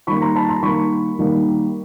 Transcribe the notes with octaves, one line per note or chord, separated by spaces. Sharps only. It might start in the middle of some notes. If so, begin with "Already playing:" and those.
D#3 G3 A#3 B5 C#6
A#5 C6
A5 B5
A#5 C6
D#3 G3 A#3 B5 C#6
D#3 G3 A#3